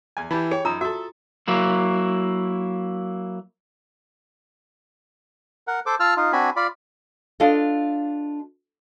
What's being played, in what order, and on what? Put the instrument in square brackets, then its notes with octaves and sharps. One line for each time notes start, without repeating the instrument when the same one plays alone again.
[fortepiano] E2 G#5
[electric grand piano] E3 E4 [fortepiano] G4 A5 B5
[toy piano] G#4 [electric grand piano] C#5 G5
[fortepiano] F#2 D#4 E6 [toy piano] F4 A#5 [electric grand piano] D#6
[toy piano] F#4 [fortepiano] A4 E5
[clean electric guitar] F#3 A#3 E4
[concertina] A#4 F#5
A4 C5 D6
F4 A5 E6 F6
D#4 F4
C4 D4 F#4 G#5 B5
F4 D5 B5
[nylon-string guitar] D4 F4 A4 D#5 F5